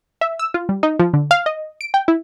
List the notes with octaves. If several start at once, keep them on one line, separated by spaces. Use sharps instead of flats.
E5
E6
F4
G3
D#4
F3
D3
F5
D#5
D7
G5
E4